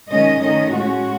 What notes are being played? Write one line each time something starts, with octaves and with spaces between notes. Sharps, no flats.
D#3 G#3 C#4 D#5
D#3 A3 C#4 D#5
A2 G#3 C#4 F#4